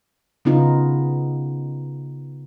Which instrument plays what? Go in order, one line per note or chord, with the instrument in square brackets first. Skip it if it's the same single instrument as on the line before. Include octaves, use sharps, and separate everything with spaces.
[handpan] C#3 B3 D#4 F4